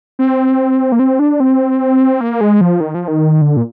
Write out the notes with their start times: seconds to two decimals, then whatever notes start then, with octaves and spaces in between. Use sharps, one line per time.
0.19 C4
0.92 A#3
0.99 C4
1.19 D4
1.40 C4
2.21 A#3
2.41 G#3
2.61 F3
2.80 D#3
2.95 F3
3.08 D#3
3.41 D3
3.57 A#2